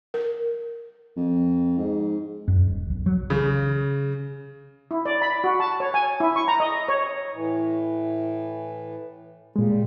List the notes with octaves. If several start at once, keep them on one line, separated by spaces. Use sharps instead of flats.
A#4
F2
G#2
F#2
D#1
B1
F#3
C#3
E4
D5
B5
F#4
A5
C#5
G#5
E4
C#6
A#5
D#5
C#5
A2 E3
A#2 C#3 G3 G#3